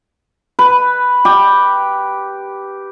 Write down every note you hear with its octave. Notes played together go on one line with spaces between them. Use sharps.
B4
G4